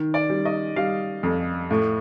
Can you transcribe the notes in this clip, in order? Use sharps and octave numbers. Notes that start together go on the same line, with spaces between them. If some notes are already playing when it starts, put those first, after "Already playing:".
Already playing: D#3
D5
G3
D#5
G3 F5
F2
A2